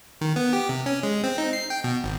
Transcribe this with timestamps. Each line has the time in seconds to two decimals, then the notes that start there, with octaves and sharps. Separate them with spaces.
0.21 D#3
0.36 B3
0.53 G4
0.69 C3
0.86 C#4
1.03 G#3
1.23 C4
1.38 D#4
1.53 C7
1.70 G5
1.84 B2
2.04 G#1